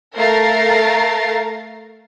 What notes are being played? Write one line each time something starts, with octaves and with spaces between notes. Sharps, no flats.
A3 A#4 F5 A#5 A6 C7